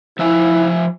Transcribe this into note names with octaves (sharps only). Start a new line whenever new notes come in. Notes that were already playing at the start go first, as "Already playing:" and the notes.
F3 E4 E5 G#5